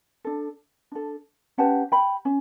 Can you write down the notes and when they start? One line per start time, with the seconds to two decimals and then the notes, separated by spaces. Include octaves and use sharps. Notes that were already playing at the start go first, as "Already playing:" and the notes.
0.25 D4 A4
0.92 D4 A4
1.58 C#4 G4 B4 F#5 A5
1.92 G5 B5
2.25 C#4